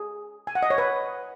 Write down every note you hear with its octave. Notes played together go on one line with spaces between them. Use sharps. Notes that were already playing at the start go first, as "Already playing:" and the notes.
Already playing: G#4
G#5
F#5
D#5
C#5
B4